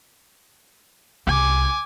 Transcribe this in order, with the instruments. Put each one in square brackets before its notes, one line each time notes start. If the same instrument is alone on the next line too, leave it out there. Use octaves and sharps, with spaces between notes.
[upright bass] C2 [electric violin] G#5 D6